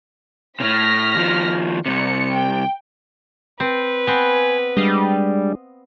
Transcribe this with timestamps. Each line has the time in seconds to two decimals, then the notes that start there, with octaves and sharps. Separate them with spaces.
0.60 A2 C3 F6 A#6 B6
1.15 D#2 F3
1.86 C2 C3 C#7
2.35 G5
3.60 C4 B4
4.07 B3 C4 G#5
4.77 G3 G#3 D4 D#5 F5